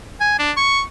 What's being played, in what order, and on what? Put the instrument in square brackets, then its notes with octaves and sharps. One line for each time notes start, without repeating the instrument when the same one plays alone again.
[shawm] G#5
D4
C#6